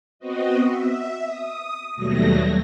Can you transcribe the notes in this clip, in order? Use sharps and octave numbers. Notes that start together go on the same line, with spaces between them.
B3 C4 F#4 D#5
E5
D#6
D#2 B2 F#3 G3 A3 A#6